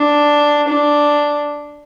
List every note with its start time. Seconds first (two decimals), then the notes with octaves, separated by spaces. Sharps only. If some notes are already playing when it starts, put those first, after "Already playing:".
Already playing: D4
0.68 D4